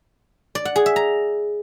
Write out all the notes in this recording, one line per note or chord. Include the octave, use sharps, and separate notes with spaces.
D5
F#5
G#4
E5
A#5